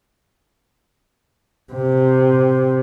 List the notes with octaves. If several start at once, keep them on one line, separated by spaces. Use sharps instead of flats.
C3